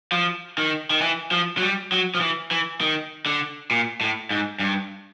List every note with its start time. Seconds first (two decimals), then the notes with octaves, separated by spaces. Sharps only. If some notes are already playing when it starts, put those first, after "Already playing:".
0.12 F3
0.58 D#3
0.90 D#3
1.01 E3
1.31 F3
1.57 F#3
1.62 G3
1.92 F#3
2.15 F3
2.21 E3
2.51 E3
2.81 D#3
3.26 D3
3.71 A#2
4.01 A2
4.31 G#2
4.59 G2